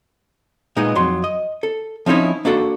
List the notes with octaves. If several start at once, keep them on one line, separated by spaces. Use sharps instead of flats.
A#2 G#3 B3 D#4
F2 F#3 C6
D#5
A4
F3 C4 C#4 D#4 E4
A#3 D4 F#4 A4